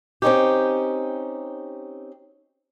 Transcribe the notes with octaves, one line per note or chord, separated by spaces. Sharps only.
C4 C#4 D#4 G4